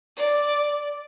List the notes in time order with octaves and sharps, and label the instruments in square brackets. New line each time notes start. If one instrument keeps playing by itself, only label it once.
[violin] D5